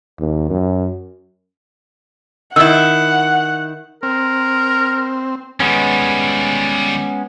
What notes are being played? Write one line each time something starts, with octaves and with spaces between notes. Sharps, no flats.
D#2
F#2
D#3 E4 D#5 F#5 E6
C4 A#4
D#3 G3 G#3 B3 C#4